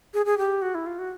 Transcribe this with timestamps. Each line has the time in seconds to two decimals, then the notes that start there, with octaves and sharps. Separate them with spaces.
0.14 G#4
0.26 G#4
0.38 G4
0.62 F#4
0.75 E4
0.86 F4
0.99 F#4